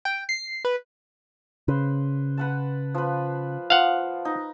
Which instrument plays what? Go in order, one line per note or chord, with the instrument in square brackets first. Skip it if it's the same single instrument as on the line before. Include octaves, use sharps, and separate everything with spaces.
[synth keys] G5
C7
B4
[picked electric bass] C#3 [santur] B4 C5
[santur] B4 F#5 A5
F3 B4
[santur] F3 [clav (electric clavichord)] F5 F#5
[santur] D#4